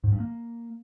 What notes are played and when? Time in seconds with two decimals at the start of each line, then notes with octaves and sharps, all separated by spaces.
0.04 G#2
0.12 G2
0.20 A#3